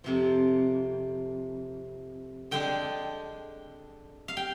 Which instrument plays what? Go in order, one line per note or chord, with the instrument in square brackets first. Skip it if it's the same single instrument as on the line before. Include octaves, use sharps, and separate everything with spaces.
[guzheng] F2 C3 F3
D3 G#3 D4 G5
F5
G5